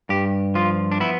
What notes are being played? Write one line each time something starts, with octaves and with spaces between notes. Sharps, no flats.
G2 G4
F3 F4
D4
B3 E4